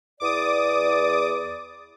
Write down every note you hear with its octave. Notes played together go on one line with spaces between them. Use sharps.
E2 D5 D6 D#6